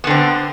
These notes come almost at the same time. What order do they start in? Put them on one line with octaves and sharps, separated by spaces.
B3 D3 C4